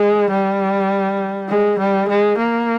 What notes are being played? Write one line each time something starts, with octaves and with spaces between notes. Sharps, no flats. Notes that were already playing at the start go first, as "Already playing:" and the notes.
Already playing: G#3
G3
G#3
G3
G#3
A#3